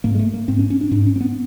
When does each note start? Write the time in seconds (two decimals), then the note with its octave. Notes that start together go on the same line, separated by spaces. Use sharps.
0.04 G#2 A#3
0.15 G#3
0.19 A3
0.33 A#3
0.48 G#2 C4
0.59 C#4
0.70 C#4
0.81 D4
0.91 G#2 D4
1.07 C#4
1.16 C4
1.21 B3